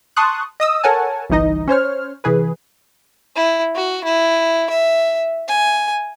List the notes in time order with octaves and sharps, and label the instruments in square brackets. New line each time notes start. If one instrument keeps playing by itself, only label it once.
[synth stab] A5 C6 C#6 D#6 F#6
D#5 D#6 E6
A4 A#4 C#5 F#5 G#5 A5
G1 C2 E3 D#4 D#5
C#4 C5 C#5 F6
C3 E3 G#4 B4
[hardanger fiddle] E4
F#4
E4
E5
G#5